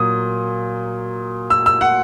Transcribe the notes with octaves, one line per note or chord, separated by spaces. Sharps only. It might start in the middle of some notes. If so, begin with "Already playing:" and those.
Already playing: A#2 F#3 D#6
E6
E6
F#5